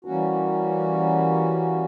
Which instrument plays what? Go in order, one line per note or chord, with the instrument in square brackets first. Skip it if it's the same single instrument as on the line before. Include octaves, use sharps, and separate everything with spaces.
[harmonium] E3 G3 A#3 C#4 F#4